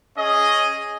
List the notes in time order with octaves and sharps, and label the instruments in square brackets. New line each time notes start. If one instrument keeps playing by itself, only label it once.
[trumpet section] C#4 G#4 D#5